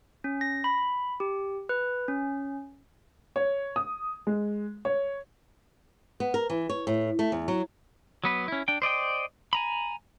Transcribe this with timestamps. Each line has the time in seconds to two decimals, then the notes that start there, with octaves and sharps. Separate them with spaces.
0.24 C#4
0.41 A#6
0.64 B5
1.20 G4
1.69 B4
2.08 C#4
3.36 C#5
3.76 D#6
4.27 G#3
4.85 C#5
6.20 B3
6.34 A#4
6.50 E3
6.69 C#5
6.87 A2
7.19 A3
7.32 E2
7.48 F#3
8.24 F#3 B3 B4
8.48 C#4 E4
8.68 D4 G5
8.82 C5 D5 D#5 G5
9.53 G#5 A#5 B5